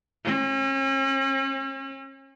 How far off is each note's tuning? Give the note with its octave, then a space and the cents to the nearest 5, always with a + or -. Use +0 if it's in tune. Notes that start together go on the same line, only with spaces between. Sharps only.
C#4 -40